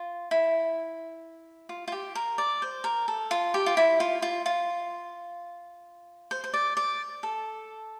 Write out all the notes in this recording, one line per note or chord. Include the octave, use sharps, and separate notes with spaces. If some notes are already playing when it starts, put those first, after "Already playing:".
Already playing: F4
E4
F4
F4
G4
A#4
D5
C5
A#4
A4
F4
G4
F4
E4
F4
F4
F4
C5
C5
D5
D5
A4